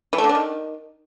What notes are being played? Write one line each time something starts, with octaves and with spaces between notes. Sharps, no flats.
E3
A3
D3
D4
D#3